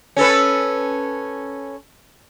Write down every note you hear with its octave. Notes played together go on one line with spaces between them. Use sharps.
C#4 A4 B4